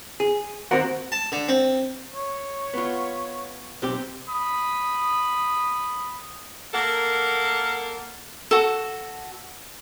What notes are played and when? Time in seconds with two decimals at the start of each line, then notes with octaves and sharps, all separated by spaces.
0.20 G#4
0.71 D#2 C4 F#4 A#4 F#5
1.12 A5
1.32 D3
1.48 C4
2.15 C#5
2.74 B3 F4
3.82 B1 C4 G4
4.29 B5 D#6
6.74 A#3 A4 A#4 F#5
8.51 F#4 A4